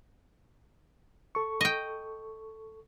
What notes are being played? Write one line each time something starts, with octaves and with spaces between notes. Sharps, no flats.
A4 C#6
D#5 G5